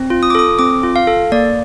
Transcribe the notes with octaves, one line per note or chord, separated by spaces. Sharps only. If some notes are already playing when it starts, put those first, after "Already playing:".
Already playing: C4
F4
D#6
D6
A4 D#6
C4 D6
F4
F5
A4
A#3 D5